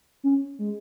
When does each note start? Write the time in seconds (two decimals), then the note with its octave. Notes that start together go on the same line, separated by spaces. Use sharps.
0.24 C#4
0.59 G#3